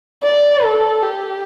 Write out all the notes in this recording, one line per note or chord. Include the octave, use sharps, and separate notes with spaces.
D5
A4
G4